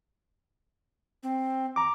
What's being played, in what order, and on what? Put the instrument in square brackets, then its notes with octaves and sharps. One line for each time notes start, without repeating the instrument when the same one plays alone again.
[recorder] C4
[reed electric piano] A#5 D6